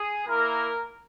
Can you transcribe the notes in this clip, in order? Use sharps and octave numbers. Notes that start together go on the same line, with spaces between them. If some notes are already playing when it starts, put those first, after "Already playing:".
Already playing: G#4
A#3 E4 A#4